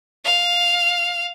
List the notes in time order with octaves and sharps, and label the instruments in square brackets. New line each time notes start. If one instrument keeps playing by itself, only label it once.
[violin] F5